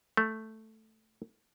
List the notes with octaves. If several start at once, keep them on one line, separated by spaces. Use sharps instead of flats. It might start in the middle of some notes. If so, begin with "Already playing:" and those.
A3